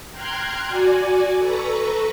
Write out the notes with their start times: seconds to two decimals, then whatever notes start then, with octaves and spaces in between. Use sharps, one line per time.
0.11 G5 A#5 C6 F6 F#6 G#6
0.68 F#4 D5 G#5
1.39 A4 B4 A#5 C#6